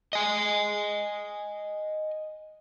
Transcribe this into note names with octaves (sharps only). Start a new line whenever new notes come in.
D#5 G#5